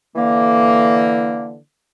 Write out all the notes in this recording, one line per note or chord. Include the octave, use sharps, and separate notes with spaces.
D3 E3 A#3